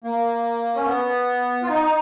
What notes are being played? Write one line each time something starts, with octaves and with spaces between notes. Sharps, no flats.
A#3
C#4
B3
F4
D#4